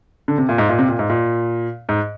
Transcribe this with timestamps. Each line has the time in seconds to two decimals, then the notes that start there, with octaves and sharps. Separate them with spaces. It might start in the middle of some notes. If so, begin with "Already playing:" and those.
0.28 D3
0.38 C3
0.49 A#2
0.58 G#2
0.69 A#2
0.79 C3
0.88 A#2
0.99 G#2
1.09 A#2
1.89 G#2